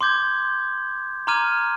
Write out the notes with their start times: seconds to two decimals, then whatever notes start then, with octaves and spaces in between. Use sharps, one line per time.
0.01 C6 D6 G6 G#6
1.27 A#5 C6 D6 F6 G#6 D#7